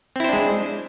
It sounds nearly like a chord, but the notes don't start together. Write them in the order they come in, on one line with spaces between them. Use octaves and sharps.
C4 E4 C5 D4 G#3